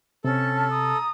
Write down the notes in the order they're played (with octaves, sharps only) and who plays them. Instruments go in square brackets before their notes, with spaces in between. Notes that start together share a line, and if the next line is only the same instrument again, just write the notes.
[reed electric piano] C3 [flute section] C#4 A5 [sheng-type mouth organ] A4
[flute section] A#5 D#6